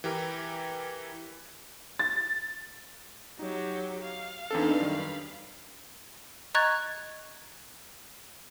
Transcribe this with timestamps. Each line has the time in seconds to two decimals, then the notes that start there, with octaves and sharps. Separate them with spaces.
0.04 E3 G4 A#4
1.99 A6
3.39 F#3 D#4 G4
4.02 F5
4.51 E2 C4 D4 D#4 A4 B4
4.80 F#2 D#3 G3 B5
6.54 D#5 A#5 C#6 F#6 G#6 A6